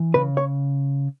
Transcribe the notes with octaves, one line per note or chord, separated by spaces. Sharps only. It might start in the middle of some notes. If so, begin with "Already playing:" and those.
Already playing: E3
C#3 B4
C#5